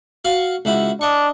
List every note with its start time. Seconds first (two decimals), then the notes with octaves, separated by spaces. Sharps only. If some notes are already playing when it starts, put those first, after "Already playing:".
0.25 F#4 F5 C#6
0.65 C#2 E4 F#4
1.01 D4 D#5 C#6